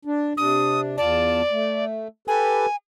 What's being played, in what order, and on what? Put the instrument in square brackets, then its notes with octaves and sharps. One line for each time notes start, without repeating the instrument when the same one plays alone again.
[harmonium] D4
[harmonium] C3 D4 [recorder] D#6
[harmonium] E2 F4 A5 [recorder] D5
[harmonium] A3
[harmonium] G4 A4 B4 [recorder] G#5